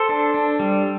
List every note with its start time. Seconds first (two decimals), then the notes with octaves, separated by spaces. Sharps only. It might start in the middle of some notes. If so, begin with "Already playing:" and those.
Already playing: A4 C5
0.09 D4
0.34 D4
0.60 G3